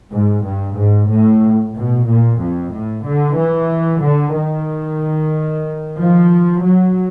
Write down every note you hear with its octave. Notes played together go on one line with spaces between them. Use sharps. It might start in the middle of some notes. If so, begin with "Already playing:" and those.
G#2
G2
G#2
A2
B2
A#2
F2
A2
D3
E3
D3
D#3
F3
F#3